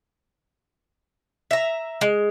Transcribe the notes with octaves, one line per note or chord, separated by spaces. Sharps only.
E5 A#5
G#3